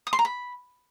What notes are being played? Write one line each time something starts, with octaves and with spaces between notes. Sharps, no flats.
D#6
C6
A#5
B5